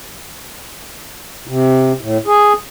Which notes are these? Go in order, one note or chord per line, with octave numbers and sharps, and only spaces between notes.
C3
A2
G#4